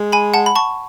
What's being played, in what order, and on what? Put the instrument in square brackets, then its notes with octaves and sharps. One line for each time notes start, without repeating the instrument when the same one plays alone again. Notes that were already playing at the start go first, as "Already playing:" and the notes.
Already playing: [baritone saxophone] G#3
[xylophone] G#5 B5
F#5 A5
B5
A5 C#6